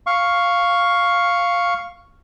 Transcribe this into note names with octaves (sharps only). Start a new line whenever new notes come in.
F5 C#6